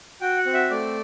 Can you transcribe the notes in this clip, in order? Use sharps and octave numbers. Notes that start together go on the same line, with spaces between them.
F#4 G5
F#5
C4
E5
A3 D5